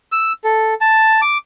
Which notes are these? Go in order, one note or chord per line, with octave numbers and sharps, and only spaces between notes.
E6
A4
A5
D6